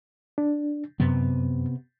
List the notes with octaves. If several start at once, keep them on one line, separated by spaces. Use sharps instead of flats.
D4
F#2 C3 B3